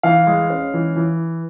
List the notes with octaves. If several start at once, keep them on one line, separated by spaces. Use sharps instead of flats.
E3 F5
G#3
C#4
E3
E3